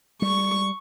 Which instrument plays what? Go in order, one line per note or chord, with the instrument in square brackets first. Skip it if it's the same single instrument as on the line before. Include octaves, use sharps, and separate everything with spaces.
[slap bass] G3 [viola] C#6